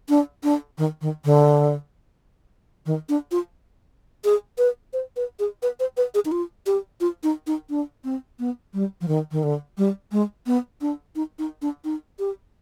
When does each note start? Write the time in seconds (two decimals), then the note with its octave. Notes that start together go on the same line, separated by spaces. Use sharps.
0.09 D4
0.44 D4
0.78 D#3
1.01 D#3
1.25 D3
2.86 D#3
3.09 D4
3.32 F4
4.24 G#4
4.58 B4
4.93 C5
5.16 B4
5.40 G#4
5.63 B4
5.80 C5
5.97 B4
6.14 G#4
6.25 D#4
6.32 F4
6.66 G4
7.01 F4
7.23 D#4
7.47 D#4
7.70 D4
8.04 C4
8.39 B3
8.74 G3
9.01 F3
9.08 D#3
9.32 D#3
9.43 D3
9.78 G3
10.12 G#3
10.47 B3
10.81 D4
11.16 D#4
11.39 D#4
11.62 D4
11.85 D#4
12.19 G4